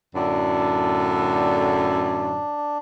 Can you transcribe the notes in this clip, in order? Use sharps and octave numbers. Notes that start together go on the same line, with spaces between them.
F#2 A2 D3 D4